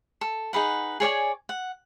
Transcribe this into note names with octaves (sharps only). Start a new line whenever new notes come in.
A4
D#4 G#4 B4 F#5
G#4 C#5 D5 G#5
F#5